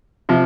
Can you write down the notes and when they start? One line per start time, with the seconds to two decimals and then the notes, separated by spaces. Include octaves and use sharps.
0.29 C3 F3